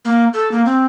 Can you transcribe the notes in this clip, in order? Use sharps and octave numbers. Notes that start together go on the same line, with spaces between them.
A#3
A4
A#3
C4